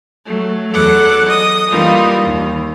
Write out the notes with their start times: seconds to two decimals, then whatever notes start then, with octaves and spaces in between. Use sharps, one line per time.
0.25 F#3 A3
0.72 E2 F#3 A4 F#5 D6
1.25 D#5 D#6
1.70 E3 G3 A#3 D#4 F4
2.23 D#2